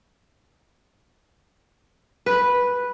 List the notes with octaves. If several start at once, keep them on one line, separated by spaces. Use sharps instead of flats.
B4